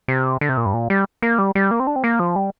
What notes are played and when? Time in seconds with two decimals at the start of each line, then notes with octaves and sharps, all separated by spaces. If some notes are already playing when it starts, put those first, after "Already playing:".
0.08 C3
0.41 D3
0.49 C3
0.57 A#2
0.66 G2
0.74 A#2
0.90 G3
1.22 A#3
1.39 G3
1.55 G3
1.71 A#3
1.80 C4
1.87 D4
1.96 C4
2.04 A#3
2.20 F3
2.36 G3